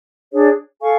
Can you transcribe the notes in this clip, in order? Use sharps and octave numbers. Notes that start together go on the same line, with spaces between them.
D4 G#4 C#5
A4 F5 G#5 C#6